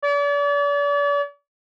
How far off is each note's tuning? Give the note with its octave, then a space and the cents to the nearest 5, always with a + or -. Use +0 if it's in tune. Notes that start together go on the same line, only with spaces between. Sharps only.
D5 -40